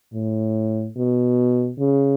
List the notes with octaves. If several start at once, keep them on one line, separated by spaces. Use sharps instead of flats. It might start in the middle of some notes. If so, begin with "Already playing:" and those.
A2
B2
C#3